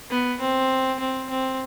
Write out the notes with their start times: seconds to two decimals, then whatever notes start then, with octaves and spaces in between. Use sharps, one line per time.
0.11 B3
0.41 C4
1.00 C4
1.30 C4